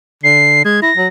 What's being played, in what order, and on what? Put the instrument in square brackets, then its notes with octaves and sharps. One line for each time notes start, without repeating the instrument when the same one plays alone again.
[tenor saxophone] D3 [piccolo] C7
[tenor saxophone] G#3 [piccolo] G#6
[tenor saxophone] E4 [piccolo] A#6
[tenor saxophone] F#3